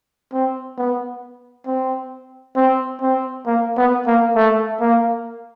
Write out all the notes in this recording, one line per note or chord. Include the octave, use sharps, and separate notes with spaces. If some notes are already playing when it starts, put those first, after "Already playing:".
C4
B3
C4
C4
C4
A#3
B3
A#3
A3
A#3